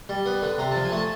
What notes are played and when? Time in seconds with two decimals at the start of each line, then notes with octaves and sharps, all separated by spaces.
0.09 G3
0.26 B3
0.42 D3
0.58 C3 A#5
0.71 F3 A5
0.85 G#5
0.92 A3
0.97 A5